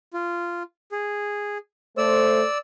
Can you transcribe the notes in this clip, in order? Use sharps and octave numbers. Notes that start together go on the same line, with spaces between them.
F4
G#4
A3 C5 D5 E6